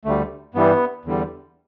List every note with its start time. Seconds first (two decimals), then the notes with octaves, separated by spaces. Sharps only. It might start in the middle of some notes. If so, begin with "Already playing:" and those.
0.05 D2 D3 G3 A3
0.55 G2 E3 G3 B3
1.05 E2 D3 G3